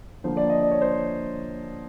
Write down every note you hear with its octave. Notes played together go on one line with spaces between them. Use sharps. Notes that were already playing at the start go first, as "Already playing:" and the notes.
D3 F3 A#3 C5
D5
D#5
D5
C#5
C5